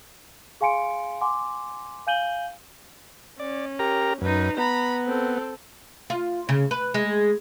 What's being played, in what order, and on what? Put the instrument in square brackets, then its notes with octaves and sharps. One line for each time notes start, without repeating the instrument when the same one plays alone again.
[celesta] G#4 F5 G#5 C6 C#7 D7
F#5 G#5 C6 D6
F5 G#5 G6 D#7 F#7 G7
[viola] C#4 [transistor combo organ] D5
[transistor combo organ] G4 A#4 A#5
[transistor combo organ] F#2 [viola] D#4 B4
[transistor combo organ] B3 [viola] A#5 B5
[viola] C4 A4
[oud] F4
C#3
B4
G#3